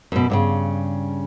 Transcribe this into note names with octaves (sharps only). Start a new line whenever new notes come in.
F#2 B2
G2 A#2 C#3